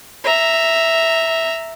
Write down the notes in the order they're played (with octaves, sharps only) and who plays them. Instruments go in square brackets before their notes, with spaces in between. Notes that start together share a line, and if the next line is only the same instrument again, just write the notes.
[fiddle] E5 A#5